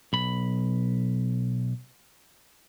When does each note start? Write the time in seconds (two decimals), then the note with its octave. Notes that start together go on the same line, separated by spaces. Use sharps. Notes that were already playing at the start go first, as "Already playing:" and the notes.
0.13 B1 B5